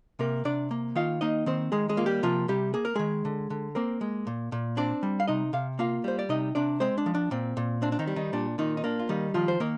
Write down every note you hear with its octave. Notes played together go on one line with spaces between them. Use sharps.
C3 A#3 A#4
C3 D4 D5
A#3
D#3 F4 F5
A#3 D#4 D#5
D#3 C4 C5
D#3 G#3 G#4
G#3 G#4
A#3 F4
G3 G4
C3 F3 F4
C3 G3 G4
A#3 G#4
A#4
D#3 G#3 G#4
D3
D3
A#3 C4 A#4
G#3
A#2
A#2
C4 D4 D5
G3
F5
C3 D#4 D#5
C3 F5
A#3 F4 F5
G3 C5
D5
C3 D#4 D#5
C3 D4 D5
G#3 C4 C5
D4
F3
D4
A#2 C4
A#2
C4 D4
D4
D#3 D#4
G3
D#3 D#4
A#2 D4
A#2 D#3 D#4
D#4
A#3 D4
F4
D#3 G3 D#4
D#3 F3 F4
C5
D#3 A#3 A#4